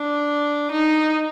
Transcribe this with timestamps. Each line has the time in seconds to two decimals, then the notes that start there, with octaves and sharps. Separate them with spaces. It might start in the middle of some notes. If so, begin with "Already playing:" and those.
Already playing: D4
0.71 D#4